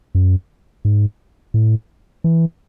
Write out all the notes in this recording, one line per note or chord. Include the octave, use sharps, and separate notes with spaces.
F#2
G#2
A2
E3